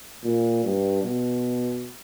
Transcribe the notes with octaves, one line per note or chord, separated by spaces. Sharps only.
A#2
G2
B2